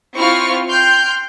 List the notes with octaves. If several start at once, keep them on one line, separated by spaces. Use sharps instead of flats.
C4 E4 F4 C#6 F6
G5 C6 F6 G6